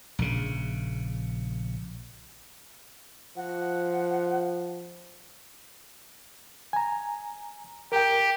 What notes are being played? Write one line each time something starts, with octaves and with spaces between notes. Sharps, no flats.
A#1 C#3
F3 F#5
G#5 A#5
G4 A#4 G5